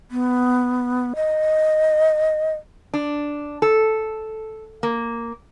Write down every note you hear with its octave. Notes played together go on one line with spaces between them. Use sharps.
B3
D#5
D4
A4
A#3